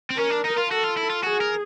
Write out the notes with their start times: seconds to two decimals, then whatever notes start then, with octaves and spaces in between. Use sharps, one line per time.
0.10 C4
0.17 C#4 A#4
0.30 D4
0.45 D#4
0.57 F4
0.70 F#4 A4
0.84 F4
0.97 E4
1.10 F4
1.23 F#4 G#4
1.41 A#4